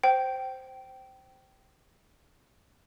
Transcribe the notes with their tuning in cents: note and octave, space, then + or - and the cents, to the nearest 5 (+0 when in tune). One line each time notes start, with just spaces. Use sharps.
C5 -5 G5 -20